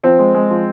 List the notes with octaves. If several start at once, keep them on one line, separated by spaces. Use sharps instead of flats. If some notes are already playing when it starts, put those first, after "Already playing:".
F3 C4
G#3
G#3
F3